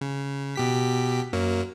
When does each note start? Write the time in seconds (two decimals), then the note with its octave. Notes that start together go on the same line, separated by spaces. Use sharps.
0.01 C#3
0.56 B2 G4 B6
1.33 F#2 F#3 A#3